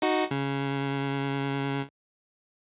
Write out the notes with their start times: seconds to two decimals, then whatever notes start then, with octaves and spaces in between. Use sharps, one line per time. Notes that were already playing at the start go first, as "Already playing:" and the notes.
0.02 D#4 F#4
0.31 C#3